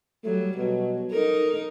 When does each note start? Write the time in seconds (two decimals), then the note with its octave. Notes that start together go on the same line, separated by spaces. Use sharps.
0.24 F#3 G3 A3
0.57 B2 F#3
1.12 D#4 A4 A#4